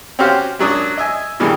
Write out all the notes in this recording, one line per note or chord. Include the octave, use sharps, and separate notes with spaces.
C4 C#4 F#4 G4 C5 F5
F#2 F#3 D4 D#6
D#5 E5 G#5
G2 A#2 D#3 E3 G3 G#3